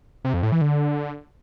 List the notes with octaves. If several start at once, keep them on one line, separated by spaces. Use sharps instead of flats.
C3
F2
A2
E3
D3